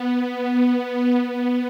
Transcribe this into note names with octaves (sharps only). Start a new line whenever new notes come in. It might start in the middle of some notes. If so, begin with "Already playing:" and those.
Already playing: B3
B3